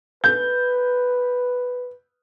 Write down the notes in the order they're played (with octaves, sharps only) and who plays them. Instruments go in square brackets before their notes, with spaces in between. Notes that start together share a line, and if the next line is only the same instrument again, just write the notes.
[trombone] B4 [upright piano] G6